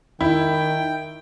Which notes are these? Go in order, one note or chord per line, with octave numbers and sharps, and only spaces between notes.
D#3 E4 G5